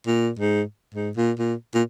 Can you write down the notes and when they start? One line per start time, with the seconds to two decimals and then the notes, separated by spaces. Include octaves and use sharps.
0.06 A#2
0.39 G#2
0.95 G#2
1.17 A#2
1.39 A#2
1.74 A#2